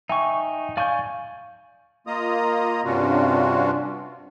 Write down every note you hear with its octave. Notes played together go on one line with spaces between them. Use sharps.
D#4 E5 G5 G#5 C#6
D5 F5 G#5 C#6 G6
A#3 F4 D#5 A#5 D#6
G2 C3 C#4 D4 F4 F#4